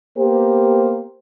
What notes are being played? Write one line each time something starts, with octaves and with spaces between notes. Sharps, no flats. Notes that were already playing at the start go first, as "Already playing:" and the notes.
A#3 B3 G4 A#4 C5